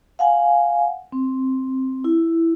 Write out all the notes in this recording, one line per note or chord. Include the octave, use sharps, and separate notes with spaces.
F5 F#5 G#5
C4
E4